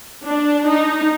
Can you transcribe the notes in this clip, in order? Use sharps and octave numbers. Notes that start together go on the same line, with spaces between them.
D4
D#4